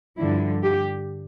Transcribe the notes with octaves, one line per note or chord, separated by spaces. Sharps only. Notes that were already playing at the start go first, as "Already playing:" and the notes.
G2 D3 F3 E4
G4